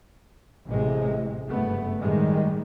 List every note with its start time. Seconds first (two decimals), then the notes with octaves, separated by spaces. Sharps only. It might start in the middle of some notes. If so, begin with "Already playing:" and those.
0.68 A1 A2 C3 G#3
1.48 F#1 G2 A3 B3
2.00 A2 D#3 G3 G#3